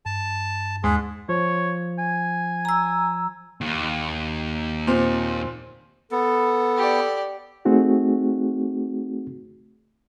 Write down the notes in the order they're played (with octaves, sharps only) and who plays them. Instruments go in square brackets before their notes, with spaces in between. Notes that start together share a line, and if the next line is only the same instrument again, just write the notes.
[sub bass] G2 [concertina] A5
[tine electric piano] D#2 G#3 [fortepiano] G#2 [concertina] G#4
[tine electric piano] F3 [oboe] C#5
[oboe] G#5
[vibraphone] A#5 E6
[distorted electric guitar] D#2
[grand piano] A#2 C4
[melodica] B3 [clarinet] A4
[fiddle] G4 D5
[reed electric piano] A3 C4 D#4 F#4 G#4